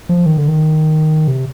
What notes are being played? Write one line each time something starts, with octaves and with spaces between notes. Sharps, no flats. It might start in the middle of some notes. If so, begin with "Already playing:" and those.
F3
D#3
D3
D#3
C3